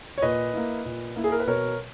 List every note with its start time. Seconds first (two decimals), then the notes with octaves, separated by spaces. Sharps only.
0.18 C#5
0.22 A#2 B4 D#5
0.54 A#3 E4
0.85 A#2
1.16 A#3 E4
1.24 G#4
1.32 A#4
1.40 B4
1.47 B2 A#4 C#5